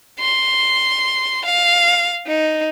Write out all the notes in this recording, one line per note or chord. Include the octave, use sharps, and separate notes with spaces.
C6
F5
D#4